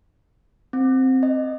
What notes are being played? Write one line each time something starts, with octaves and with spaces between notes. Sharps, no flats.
C4
D#5